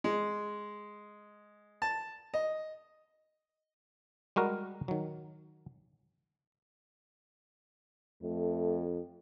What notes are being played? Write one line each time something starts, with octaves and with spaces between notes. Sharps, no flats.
G#3
A5
D#5
G3 G#3 F#4 A#4
D#3 F#3
F2 A3